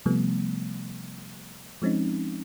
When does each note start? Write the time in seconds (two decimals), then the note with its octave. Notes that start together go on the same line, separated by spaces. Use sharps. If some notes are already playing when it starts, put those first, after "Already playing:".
0.06 C3 F3 G3 A3 B3
1.82 F3 G#3 C4 C#4 D#4